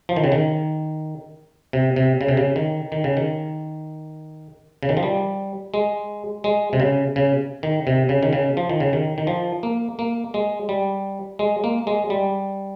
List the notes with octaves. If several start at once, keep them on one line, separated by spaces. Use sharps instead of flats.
F3
D#3
C#3
D#3
C3
C3
C#3
C3
C#3
D#3
D#3
C#3
D#3
C#3
D#3
F3
G3
G#3
G#3
C3
C#3
C#3
D#3
C3
C#3
D#3
C#3
F3
D#3
C#3
D#3
D#3
F3
A#3
A#3
G#3
G3
G#3
A#3
G#3
G3